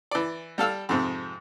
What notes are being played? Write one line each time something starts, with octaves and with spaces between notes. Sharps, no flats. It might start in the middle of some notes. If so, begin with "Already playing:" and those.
E3 D5
G3 A4 F5 E6
F2 G#2 C3